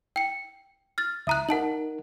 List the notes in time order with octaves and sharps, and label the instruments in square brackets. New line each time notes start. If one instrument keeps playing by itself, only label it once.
[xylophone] G5 C#7
F6 A6
[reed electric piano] C#2 D#6 [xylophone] E5 A#5 F#6
[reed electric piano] D#4 A#4 [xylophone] F#5 A5 F#7